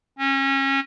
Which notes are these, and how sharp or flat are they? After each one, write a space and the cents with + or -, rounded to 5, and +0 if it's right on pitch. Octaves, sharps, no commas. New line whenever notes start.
C#4 -30